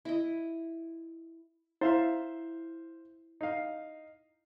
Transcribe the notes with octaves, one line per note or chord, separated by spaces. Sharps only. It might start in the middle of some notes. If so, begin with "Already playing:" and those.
E4 D#5
E4 C5 E5 F5
D#4 F5